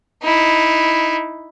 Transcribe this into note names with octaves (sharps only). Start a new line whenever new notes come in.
D#4 E4